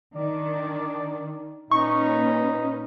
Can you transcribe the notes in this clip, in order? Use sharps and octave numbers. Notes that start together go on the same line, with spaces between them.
D#3 D4 D5
A#2 C#4 D#4 B4 C#6